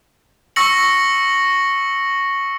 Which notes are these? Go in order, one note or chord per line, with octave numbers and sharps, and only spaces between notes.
C#6 E6 A#6 C#7 F#7